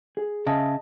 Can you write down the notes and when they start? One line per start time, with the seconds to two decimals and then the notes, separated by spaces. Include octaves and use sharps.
0.17 G#4
0.47 C#3 D#5 E5 A5